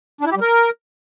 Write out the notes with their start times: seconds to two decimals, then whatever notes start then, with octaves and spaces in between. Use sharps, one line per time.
0.21 D4
0.26 E4
0.31 G4
0.36 G3
0.41 A#4